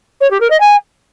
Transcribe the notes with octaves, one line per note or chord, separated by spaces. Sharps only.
C#5
G4
A#4
D#5
G#5